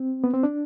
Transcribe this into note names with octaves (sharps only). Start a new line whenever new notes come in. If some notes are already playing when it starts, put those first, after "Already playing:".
Already playing: C4
B3
C4
D4